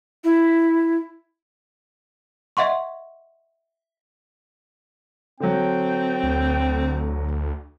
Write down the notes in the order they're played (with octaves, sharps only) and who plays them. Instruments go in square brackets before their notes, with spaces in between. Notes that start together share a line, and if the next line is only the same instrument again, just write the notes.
[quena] E4
[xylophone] D#5 E5 F#5 C6 C#6
[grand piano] D3 F#3 [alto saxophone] C4 [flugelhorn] G5
[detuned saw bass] D2